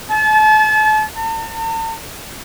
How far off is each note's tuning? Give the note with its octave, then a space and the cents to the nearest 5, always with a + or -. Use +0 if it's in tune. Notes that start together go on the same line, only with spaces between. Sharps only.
A5 -35
A5 +45